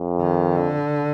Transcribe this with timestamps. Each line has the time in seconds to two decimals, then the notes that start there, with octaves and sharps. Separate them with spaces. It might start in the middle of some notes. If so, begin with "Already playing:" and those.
Already playing: F2
0.20 D#3
0.56 D3